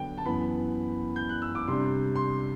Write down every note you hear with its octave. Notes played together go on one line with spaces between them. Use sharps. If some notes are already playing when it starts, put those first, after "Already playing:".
Already playing: D3 F#3 B3 G5
A5
F#2 E3 B3 B5
G6
F#6
E6
D6
C3 G3 D4 C6
C6